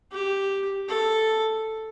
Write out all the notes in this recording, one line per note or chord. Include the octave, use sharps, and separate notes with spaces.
G4
A4